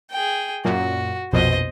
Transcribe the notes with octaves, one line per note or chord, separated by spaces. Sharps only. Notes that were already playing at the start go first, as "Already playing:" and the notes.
G#4 G5
F#2 A#2 F#4
A#1 F2 B2 C5 D#5